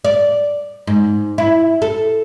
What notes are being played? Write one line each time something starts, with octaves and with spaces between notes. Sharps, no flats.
D5
G#2
E4
A4